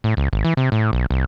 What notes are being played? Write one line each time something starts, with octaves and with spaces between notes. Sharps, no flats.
A2
C#2
G#1
E3
C3
A2
B1
C2